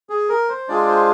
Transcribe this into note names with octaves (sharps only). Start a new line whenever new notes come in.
G#4
A#4
C5
G#3 D4 F4 G#4 D5
C5